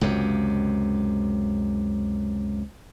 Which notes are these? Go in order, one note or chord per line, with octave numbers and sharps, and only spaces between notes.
C#2 F#2 C3